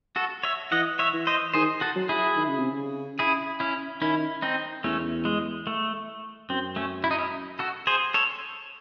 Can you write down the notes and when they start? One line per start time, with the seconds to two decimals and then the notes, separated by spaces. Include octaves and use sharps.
0.16 F#4 A4
0.43 C#5 E5
0.72 E3 D#5 F#5
0.99 C#5 E5
1.13 E3
1.27 C5 D#5
1.54 D#3 G#4 C5
1.81 F#4 A4
1.96 F#3
2.09 E4 G#4
2.36 D#3
2.48 C#3
2.59 C3
2.71 C#3
3.19 E4 G#4
3.60 C#4 E4
4.01 D#3 C#4 E4
4.42 C4 D#4
4.84 E2 A3 C#4
5.25 G#3
5.67 A3
6.50 F#2 C4
6.76 A3 C#4
7.04 E4
7.11 D#4
7.18 C#4 E4
7.59 F#4 A4
7.87 G#4 C5
8.14 A4 C#5